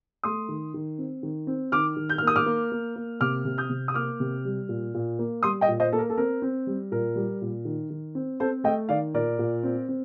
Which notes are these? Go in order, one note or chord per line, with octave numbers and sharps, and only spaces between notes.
A3 C6 D#6
D#3
D#3
C4
D#3
C4
D#3 D6 F6
D#3
G6
F6
A#3 D#6
D6 F6
A#3
A#3
A#3
C3 D6 F6
C3
D#6 G6
C3
D#6
A#3 D6 F6
C3
G3
A#2
A#2
A#3
G3 C6 D#6
D#5 G5
A#2
C5 D#5
A#3 A4
A#4
A4
C4 A#4
C4
G3
A#2 A#4
G3
A#2
D#3
D#3
C4
C4 A4 C5
A3 D#5 G5
D#3 D5 F5
A#2 A#4 D5
A#2
C4
C4